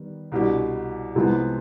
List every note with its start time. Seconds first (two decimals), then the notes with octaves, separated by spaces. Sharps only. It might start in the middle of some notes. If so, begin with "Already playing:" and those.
Already playing: D#3 G3 B3
0.32 C2 B2 G3 D4 G4
1.15 C2 C3 F3 G#3 B3